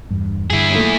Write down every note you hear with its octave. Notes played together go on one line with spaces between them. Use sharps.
E2 G2
G2 D3 E4 G#4
F#2 A#2 A3